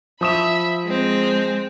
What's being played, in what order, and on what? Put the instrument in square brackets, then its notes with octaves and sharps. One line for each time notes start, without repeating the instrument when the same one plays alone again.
[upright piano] F3 D#6 E7 [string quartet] E5 B5
[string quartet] G#3 C4